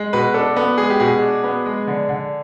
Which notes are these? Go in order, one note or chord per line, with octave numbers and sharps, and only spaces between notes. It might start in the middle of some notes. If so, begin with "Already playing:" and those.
Already playing: G#3
B2 B4
D4 A4
B3
G#3 G#4
G4
B2 G#4
D4
B3
G#3
D3
D3